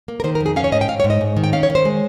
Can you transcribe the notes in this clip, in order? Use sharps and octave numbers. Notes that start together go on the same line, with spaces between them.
A#3
A#4
D#3 C5
A#4
F2
G#4
C#4 F5
C#5
G#2 D#5
G5
G#2 F5
C#5
G#2
D#5
G#2
D#3
G5
C#4 F5
C#5
D#3
C5
G#3